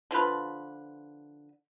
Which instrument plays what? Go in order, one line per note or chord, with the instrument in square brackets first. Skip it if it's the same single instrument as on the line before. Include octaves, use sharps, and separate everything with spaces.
[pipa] D3 F3 F4 B4